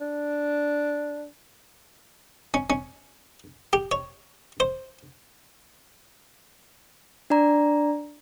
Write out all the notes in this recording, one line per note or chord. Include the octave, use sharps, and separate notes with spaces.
D4
C#4
C#4
G4
C#5
C5
D4 D5 A#5